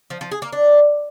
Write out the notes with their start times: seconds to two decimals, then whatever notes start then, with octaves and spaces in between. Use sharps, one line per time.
0.10 F3
0.21 F3
0.31 G#4
0.42 A#3
0.52 D4